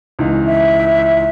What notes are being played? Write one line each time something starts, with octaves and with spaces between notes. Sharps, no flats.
C#2 E3 D#4
E5